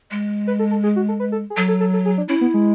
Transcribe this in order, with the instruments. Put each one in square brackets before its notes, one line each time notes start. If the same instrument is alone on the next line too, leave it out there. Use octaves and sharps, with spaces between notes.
[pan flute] G#3
[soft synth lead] B4
A4
A4
G#4
F#4
A4
B4
A4
G#4
[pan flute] F#3 [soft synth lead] A4
[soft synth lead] A4
A4
A4
G#4
D4
[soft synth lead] C#4 [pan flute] E4
[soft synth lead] B3
G#3